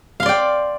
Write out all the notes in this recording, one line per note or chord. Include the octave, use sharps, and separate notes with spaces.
D5 F5 G5 C6